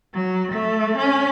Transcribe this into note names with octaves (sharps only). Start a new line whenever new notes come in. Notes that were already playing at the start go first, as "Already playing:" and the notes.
F#3
A3
C#4